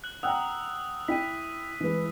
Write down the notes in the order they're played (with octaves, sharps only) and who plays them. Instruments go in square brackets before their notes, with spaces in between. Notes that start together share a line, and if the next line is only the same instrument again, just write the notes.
[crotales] F#6 F#7
[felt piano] F#5 G5 A#5 [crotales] D#6 E6 F#6
[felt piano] E4 G5 [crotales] B6 D#7
[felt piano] E3 G#3 B4